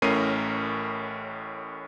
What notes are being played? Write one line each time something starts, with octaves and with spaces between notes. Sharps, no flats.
A1 A2 C#4 A#4 C7 D#7